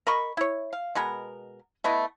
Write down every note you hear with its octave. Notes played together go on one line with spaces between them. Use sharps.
A#4 D#5 B5 C#6
E4 C#5
F5
B2 G#3 B3 A#4
A3 B3 E4 D#5